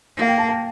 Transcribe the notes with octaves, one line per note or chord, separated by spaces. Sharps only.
A#3
F5
G5
A5
A5